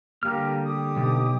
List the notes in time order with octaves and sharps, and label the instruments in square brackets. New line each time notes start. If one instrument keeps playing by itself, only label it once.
[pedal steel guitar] D3 G3 F6 [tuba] A#3 [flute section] G4 A#4 F5
[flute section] G4 D6 D#6
[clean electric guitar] B1